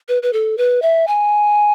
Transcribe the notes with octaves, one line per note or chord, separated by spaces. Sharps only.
B4
B4
A4
B4
E5
G#5